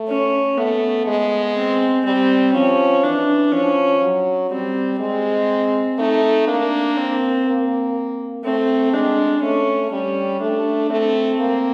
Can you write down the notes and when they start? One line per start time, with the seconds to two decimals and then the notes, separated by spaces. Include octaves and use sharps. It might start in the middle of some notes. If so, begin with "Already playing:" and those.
Already playing: A3
0.08 C#4
0.57 A3 B3
1.07 G#3
1.56 C4
2.05 G3 C4
2.54 F3 C#4
3.03 E3 D4
3.52 F3 C#4
4.01 F#3
4.51 G3 C4
5.00 G#3 C4
5.98 A3 D#4
6.47 A#3 D4
6.97 C4
7.46 A#3
8.44 A3 C4
8.93 G#3 D4
9.42 A3 C#4
9.92 G3 C#4
10.41 A3 D4
10.90 A3 C4
11.40 A#3